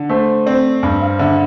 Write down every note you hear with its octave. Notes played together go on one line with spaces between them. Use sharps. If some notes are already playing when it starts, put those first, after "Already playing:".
Already playing: D3
A3 C5
C4 D5
G2
F5
D3 E5